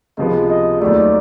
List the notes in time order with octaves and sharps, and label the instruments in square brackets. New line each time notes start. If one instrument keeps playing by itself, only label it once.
[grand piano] C#2 C3 F3 G#3 B3 [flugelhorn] D#5
[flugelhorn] D#5
[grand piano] D#2 D#3 F#3 A3 [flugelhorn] D5